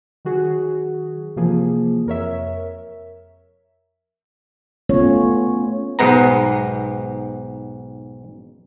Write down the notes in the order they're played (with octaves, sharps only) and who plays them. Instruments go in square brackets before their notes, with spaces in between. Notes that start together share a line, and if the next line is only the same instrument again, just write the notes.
[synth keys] D#3 F#3 F#4 G#4
C3 E3 F3 A#3 G#4
F2 A#4 C#5 E5
[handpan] A3 B3 C#4 F4 C#5
[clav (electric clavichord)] B1 G#2 B3 A#5